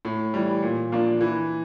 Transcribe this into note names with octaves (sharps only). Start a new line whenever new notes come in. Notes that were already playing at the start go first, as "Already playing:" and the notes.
A2
E3 G3
A#2
F3 A#3 D4
E3